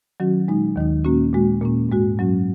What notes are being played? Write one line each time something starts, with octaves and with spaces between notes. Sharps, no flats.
D#3 F#3 C#4 F#4
A#2 G#3 D#4
D#2 D#3 G#3 D#4
A#2 A#3 C#4 F#4
A#2 G#3 F#4
A#2 A#3 C#4
G#2 G#3 F#4
F#2 F#3 C#4 F#4